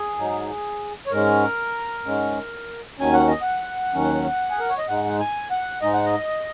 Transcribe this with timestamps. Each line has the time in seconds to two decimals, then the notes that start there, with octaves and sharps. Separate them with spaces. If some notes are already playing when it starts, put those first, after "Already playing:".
Already playing: G#4
0.17 G#2 F#3 D#4
1.06 C#5
1.11 G#2 G#3 C#4 A#4
2.06 G#2 G#3 C#4
2.99 D#2 D#3 F#3 C#4 G#5
3.13 F#5
3.28 D#5
3.41 F#5
3.94 D#2 D#3 F#3 C#4
4.50 G#4
4.60 A#4
4.70 C#5
4.78 D#5
4.88 G#2 G#3 D#4 F#5
5.20 G#5
5.51 F#5
5.82 G#2 G#3 D#4 D#5
5.94 F#5
6.06 D#5